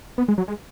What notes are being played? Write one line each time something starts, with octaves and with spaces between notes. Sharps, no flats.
B3
G#3
F#3
G#3